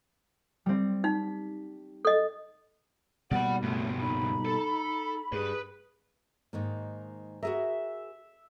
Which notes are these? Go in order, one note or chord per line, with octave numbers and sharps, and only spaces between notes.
G3 C4
D#4 B6
A4 D#5
B2 G3 A#3 D5 F#5 B5
C#2 G2 A3
D#4 B5
A4
G2 G#4 B4
G#2 D#3 A#3
F#4 G#4 A#4 E5